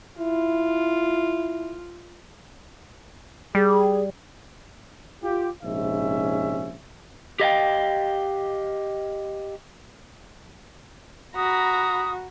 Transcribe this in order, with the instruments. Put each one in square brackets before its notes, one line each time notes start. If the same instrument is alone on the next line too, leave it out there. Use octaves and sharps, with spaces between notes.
[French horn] E4 [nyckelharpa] F4
[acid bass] G3 [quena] G#4
[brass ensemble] F4 G4
A#1 G#2 C3 C#4 E5
[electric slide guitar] G4 D#5 F5 G5
[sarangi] F#4 [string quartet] A#5 B5 [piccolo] D#6